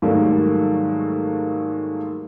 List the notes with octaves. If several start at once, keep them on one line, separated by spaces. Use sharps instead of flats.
G#2 D#3 F#3 G3 A3 A#3